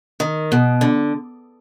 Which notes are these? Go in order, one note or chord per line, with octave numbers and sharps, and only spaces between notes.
D#3
B2
D3